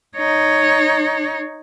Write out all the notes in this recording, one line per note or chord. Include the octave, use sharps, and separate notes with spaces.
D#4 C#5